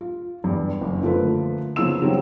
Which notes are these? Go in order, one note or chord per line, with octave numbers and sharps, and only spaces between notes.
F4
E2 G2
F#1
D3 F3 A3 A#3 F4 B4
C#3 F3 A#3 B3 E6 E7
D#3 F#3 G3 C4 D#4